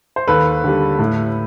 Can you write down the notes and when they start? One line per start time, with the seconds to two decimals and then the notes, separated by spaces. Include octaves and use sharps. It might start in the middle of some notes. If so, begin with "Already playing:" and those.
0.16 C5
0.27 D#2 A4 B4
0.64 D3 G3
0.99 A2